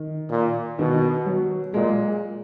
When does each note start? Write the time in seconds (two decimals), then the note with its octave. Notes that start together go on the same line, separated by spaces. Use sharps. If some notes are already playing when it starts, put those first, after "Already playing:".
Already playing: D#3
0.30 A#2
0.78 B2 D#3
1.26 F#3
1.73 A#2 G#3